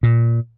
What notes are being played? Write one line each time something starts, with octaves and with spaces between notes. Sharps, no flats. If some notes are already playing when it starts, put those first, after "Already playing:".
A#2